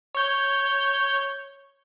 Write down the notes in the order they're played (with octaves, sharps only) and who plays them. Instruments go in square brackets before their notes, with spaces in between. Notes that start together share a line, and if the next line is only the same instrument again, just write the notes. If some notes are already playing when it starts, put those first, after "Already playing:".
[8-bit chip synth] C#5 G6